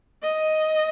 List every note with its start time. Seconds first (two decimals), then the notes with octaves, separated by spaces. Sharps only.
0.23 D#5